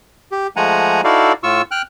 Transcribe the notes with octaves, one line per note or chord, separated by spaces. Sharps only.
G4
F3 G#3 A3 F#5 G#5 A#5
D#4 E4 F#4 A4 D5 F5
A2 F4 C#6 E6
G5 F6 F#6